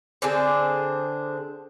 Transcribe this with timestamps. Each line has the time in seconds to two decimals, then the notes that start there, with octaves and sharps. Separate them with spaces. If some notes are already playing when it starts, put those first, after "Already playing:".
0.22 D3 C4 D4 G#4